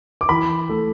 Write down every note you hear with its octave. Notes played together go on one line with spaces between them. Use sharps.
D6
E3 B5
A3